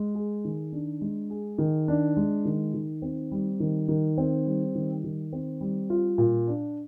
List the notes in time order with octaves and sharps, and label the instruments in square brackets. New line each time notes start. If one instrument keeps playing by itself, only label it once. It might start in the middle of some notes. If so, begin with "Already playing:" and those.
Already playing: [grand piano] G#3
G#4
D#3
D4
G#3
G#4
D#3
D4
G#3
D#3
D#3
C4
G3
D#3
D#3
C4
G3
D#3
D#3
C4
G3
F4
A#2
D4